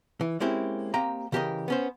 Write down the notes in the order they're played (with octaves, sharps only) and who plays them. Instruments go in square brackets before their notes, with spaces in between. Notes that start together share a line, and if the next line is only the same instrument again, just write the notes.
[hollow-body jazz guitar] E3
G#3 A#3 C4 C#4 E4 G4
A#3 C4 G4 D#5 G5 A#5
C#3 E3 G4 A4 A#4 D#5
B3 C#4 C5